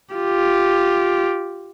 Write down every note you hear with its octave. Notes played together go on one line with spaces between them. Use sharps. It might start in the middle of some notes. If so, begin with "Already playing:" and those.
F4 G4